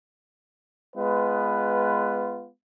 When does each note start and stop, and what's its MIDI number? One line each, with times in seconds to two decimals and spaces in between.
0.95 2.48 56
0.95 2.48 59
0.95 2.48 65
0.95 2.48 71